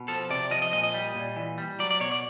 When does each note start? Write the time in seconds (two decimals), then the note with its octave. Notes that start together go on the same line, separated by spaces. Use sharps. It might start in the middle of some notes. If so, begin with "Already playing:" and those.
Already playing: B2
0.08 F3 A4
0.30 C3 D5
0.51 F3 D#5
0.62 D#5
0.73 A#2 D#5
0.83 D#5
0.94 G3
1.16 A#2
1.36 E3
1.58 G3
1.79 F#3 D5
1.91 D5
2.00 B2 C#5
2.12 D5